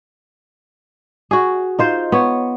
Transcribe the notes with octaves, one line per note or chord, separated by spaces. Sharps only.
F#4 G#4
D#4 F4 C5
B3 C#5